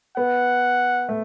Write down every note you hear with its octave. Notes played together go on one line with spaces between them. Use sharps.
B3 F#5
A3